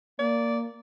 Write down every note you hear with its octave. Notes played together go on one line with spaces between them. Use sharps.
A#3 D5